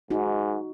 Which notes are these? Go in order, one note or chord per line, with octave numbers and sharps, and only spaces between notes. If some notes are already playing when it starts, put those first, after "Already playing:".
G#2 D#4 F#4